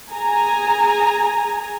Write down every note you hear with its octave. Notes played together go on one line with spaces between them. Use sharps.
G#4 G#5 A#5